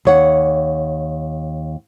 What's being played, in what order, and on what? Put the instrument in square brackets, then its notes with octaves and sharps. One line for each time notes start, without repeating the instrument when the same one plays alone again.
[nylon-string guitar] D#2 C#5 F#5